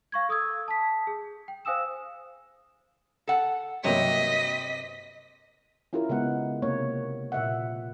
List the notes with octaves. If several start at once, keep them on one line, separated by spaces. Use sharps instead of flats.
F5 C#6 G#6
A4 D#6 E6 G#6
A5 D#6 B6
G#4
G5
C5 F5 G#5 D#6 E6 E7
A4 F#5
G2 C3 F#3 A#3 D#5 B6
C#4 E4 F4 G4 A#4
C#3 G#3 B3 F#5
C3 A#3 C#5
A#2 E5 F#5